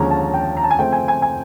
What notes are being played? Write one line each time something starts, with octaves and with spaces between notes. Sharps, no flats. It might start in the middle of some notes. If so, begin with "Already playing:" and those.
Already playing: D#2 D3 F3 G#3 C#4 A#5
A5
G5
A#5
A5
G#5
C#3 F3 A3 C4 G5
G#5
G#5
G#5